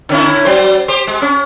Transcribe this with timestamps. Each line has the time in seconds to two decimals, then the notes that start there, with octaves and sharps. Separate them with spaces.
0.09 D3 C#4 E4
0.45 F#3 C5
0.88 G4 C5
1.07 G#3
1.22 C#4